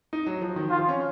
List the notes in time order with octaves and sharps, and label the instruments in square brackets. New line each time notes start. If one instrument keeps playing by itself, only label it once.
[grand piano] D#4
F#3
F3
D#3
[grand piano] D#3 [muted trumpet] F4
[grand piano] F3
C#4